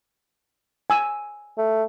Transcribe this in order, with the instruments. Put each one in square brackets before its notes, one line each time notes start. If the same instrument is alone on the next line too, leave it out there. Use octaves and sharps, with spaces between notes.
[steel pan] G#5 E6
[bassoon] A3